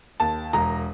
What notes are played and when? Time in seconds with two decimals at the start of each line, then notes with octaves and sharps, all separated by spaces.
0.20 D#2 A5
0.53 E1 A#5